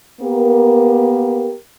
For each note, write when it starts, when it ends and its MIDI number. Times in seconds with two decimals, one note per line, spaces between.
0.22 1.54 58
0.22 1.54 59
0.22 1.54 67
0.22 1.54 70